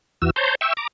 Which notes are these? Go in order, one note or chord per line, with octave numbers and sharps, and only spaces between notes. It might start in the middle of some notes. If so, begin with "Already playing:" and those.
E2 E3 F#4 E6
C5 C#5 A5 A#5 C6 G6
E5 G5 C#6 E6
A#5 D6